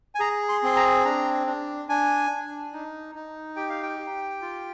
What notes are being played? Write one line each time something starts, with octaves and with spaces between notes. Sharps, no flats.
G#5
G#4 A#5
C6
C4 C6
A#5
D4 A#5
D4
D4 G#5
D4
D#4
D#4
G4 G5
F5
G5
G4
F4